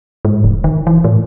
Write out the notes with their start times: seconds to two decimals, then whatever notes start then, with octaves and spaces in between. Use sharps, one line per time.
0.25 G#2
0.44 E1
0.64 D#3
0.87 E3
1.04 A2